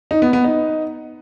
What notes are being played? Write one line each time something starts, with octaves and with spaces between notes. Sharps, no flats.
D#4
B3
B3
D#4